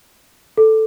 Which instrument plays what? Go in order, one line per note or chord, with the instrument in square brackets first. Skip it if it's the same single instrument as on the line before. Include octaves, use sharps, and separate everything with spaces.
[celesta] A4